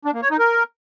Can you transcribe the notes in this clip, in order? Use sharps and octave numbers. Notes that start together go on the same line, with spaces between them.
D4
A#3
C#5
D#4
A#4